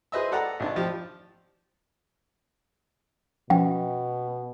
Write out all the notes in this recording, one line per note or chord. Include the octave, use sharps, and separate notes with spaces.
G#4 B4 C5 D#5 E5 E6
A4 D5 F#5 A5 A#5
G#1 D4 A5
F3 G4
B2 F3 C#4 G5